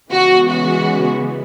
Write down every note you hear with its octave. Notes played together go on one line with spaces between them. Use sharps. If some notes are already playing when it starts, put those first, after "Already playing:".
C#3 E3 G#3 B3 F#4
F#4